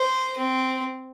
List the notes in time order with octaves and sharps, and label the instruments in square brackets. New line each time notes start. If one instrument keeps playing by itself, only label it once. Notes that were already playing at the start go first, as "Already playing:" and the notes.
Already playing: [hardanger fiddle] C5
C4